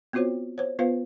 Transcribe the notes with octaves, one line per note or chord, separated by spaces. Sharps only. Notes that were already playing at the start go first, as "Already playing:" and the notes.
B3 C4 F4 F#4 C5 C#5
C5 C#5
B3 F4 B4 C5 F5